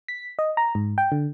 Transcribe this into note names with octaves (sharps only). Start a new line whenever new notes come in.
B6
D#5
A#5
G#2
G5
D3